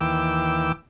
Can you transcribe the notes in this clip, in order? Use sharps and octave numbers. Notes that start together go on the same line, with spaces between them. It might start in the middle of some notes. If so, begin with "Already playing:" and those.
D#2 E3 G5 D6 E6